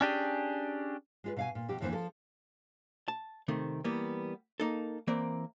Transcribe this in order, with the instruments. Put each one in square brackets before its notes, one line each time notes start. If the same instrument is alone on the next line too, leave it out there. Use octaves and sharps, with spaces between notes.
[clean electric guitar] C#4 D4 G4 G#4
[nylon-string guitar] G#3 F4 B4
B2 F5 G#5
A#2
B2 F3 G4
F2 D3 E3 A#3 C5
F3 A4
[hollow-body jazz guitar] A5
C3 D#3 A3 C4
E3 G3 A#3 B3
A#3 D#4 A4
E3 A#3 C4 A#4 D5